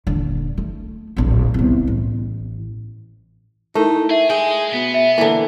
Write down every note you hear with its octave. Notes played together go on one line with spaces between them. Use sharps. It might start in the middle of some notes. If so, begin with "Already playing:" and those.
D#1 D3
A3
D1 A#1
C2 B3
A1
A3 D#4 E4 A#4
G#4 E5
G#3 G#4 D#5 G5
B2 B3
E5
D3 E3 A#3